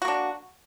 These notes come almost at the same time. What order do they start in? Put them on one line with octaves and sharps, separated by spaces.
F#4 A#3 D4